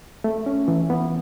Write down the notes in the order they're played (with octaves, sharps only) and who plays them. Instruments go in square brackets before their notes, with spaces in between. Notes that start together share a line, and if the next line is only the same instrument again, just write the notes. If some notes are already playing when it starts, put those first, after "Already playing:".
[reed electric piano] A3
C#4
E3
B3